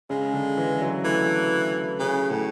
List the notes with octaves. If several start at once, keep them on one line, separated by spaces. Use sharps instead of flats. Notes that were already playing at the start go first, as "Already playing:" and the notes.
C#3 G#3
D3
E3
F#3
E3 A3
C#3
A2